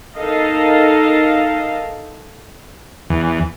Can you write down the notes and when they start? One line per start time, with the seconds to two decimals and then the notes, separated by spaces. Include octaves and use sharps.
0.16 D#4 A4 A#4 D#5 F5
3.10 E2